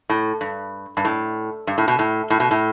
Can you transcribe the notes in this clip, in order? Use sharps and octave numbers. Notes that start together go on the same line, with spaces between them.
A2
G2
G2
A2
G2
A2
B2
A2
A2
B2
A2